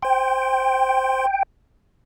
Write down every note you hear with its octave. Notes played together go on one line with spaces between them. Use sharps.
C5 G5 C6